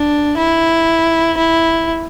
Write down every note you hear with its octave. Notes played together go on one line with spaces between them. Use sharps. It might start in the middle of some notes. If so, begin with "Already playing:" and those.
Already playing: D4
E4
E4